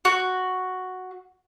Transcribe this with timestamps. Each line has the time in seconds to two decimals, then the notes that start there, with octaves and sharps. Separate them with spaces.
0.05 F#4